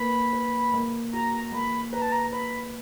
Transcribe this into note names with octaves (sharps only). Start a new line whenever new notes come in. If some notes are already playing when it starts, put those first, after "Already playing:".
Already playing: A#3 B4 B5
B4
A#3
F#4 A#5
A#3 B5
B4 A#5
A5
A#5
B4 B5